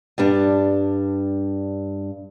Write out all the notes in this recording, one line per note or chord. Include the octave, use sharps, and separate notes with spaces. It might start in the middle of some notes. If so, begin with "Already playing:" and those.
G2 G3 D4